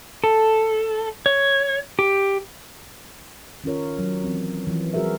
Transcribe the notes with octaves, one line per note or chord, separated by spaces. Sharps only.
A4
C#5
G4
D#3 C#4 F4 A#4 C#5
F#3
E3 C4
E3 F3
G3 F#4 G#4 A#4 E5